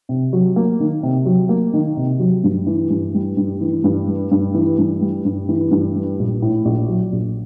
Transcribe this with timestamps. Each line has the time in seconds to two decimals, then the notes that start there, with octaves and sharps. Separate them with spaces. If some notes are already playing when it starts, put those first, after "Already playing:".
0.09 C3
0.33 F#3
0.56 A#3
0.80 D#3
1.03 C3
1.26 F#3
1.49 A#3
1.73 D#3
1.97 C3
2.19 F#3
2.44 G2
2.67 E3
2.90 G2
3.14 G3
3.37 G2
3.61 E3
3.84 G2
4.08 G3
4.31 G2
4.54 E3
4.78 G2
5.01 G3
5.25 G2
5.49 E3
5.71 G2
5.96 G3
6.19 A#1
6.42 A2
6.65 A#1
6.88 F#3
7.12 A#1